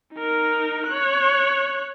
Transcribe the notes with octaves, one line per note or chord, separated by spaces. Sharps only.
D#4 A#4
C#5 F#6